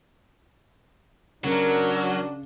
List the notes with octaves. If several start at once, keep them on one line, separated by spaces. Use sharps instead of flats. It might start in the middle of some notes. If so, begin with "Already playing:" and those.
C#3 F#3 D4 A#4